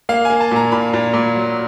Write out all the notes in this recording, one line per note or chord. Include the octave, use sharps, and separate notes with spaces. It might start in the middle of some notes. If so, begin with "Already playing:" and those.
A#3 F5
A#3 G#5
A5
A#2 A#5
A#2 B5
A#2
A#2
F#3